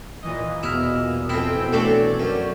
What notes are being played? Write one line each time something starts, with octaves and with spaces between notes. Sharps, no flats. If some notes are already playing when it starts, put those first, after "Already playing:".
A#2 E3 D#5
E2 B2 E4 F6
F2 C4 E4 G5
B2 E3
A3 C4 D4 C#5 D5
F#2